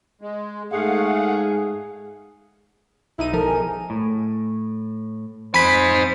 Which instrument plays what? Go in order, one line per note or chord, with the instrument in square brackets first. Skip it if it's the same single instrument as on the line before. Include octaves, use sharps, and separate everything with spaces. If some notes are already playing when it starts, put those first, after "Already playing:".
[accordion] G#3
[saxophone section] G#2 G#4 [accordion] A3 F5 F#5
[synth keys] B1 D#4 D#7 [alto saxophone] E4
[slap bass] F3 [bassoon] A4 [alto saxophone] A#4
[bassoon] G#4
[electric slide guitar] A2
[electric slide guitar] F2 [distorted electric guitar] D#4 G#5 [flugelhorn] C5 [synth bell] B5 B6